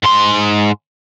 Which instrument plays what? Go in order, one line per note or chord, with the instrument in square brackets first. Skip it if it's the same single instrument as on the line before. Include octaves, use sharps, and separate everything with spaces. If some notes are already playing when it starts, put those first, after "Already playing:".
[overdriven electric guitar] G#2 C6